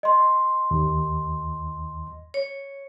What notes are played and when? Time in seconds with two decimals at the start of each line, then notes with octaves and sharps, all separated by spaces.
0.03 D#5 C6
0.71 D#2
2.34 C#5